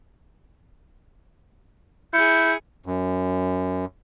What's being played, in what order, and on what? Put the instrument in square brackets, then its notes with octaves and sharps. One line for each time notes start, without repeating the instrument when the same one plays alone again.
[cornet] E4 [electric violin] G#4 C#7 [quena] G6
[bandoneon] F#2